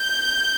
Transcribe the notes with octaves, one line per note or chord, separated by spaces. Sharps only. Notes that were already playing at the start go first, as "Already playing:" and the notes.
Already playing: G6